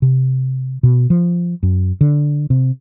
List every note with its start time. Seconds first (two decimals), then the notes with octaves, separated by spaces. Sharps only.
0.02 C3
0.83 B2
1.10 F3
1.63 F#2
2.01 D3
2.50 C3